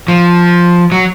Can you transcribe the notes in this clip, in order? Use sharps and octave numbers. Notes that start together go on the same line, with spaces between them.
F3
F#3